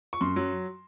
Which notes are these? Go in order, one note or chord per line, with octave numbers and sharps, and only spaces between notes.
C#6
F#2 C6
F#3